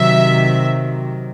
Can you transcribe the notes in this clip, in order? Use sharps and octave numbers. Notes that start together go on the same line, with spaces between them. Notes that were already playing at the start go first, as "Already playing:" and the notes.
Already playing: C3 D#3 F#3 E5